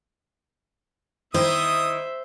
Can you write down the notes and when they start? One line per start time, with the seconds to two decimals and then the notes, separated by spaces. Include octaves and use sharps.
1.34 D#3 E4 C5 E5 D#6